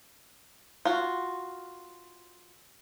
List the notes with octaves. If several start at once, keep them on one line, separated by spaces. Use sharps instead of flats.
F4 F#4